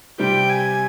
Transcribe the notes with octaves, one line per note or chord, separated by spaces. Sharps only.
C3 G3 C4 G4 G5
G#5